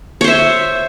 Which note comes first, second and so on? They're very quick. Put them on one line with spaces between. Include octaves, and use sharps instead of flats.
C#5 C5 E5